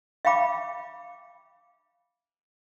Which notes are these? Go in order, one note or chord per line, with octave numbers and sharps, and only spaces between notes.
E5 F5 G5 B5 D6